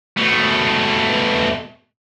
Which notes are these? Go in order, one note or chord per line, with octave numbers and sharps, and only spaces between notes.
B2 A3